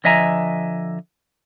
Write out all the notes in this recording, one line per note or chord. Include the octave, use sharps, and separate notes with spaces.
D3 F3 D#5 E5 G#5 A#5